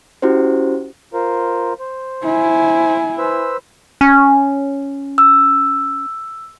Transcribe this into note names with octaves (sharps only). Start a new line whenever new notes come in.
C#4 E4 F#4 G4 C5
F4 A#4 C5
C5
E4 G#5
B4 C5 E6
C#4
E6